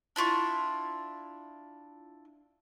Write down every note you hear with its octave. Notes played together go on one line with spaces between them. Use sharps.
D4 E4 F4 C#6